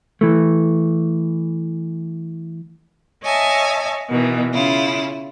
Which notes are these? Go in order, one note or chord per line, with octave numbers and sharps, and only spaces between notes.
E3 A3
C#5 D#5 E5 G#5 A5
B2 D#3 E3
C#3 E4 F4